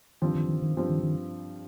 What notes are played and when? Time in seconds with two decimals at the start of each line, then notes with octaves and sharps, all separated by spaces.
0.22 G2 D#3 F3 C4
0.36 D#3
0.49 D#3
0.62 D#3
0.77 G2 F3 C4
0.89 D#3
1.03 D#3